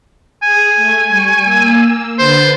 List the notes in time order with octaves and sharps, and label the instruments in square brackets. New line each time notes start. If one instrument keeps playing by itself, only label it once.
[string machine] G#4 [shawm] G#5
[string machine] A3 G#6
G3 C#6
A#3 E6
[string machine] D3 B4 A6 [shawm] C5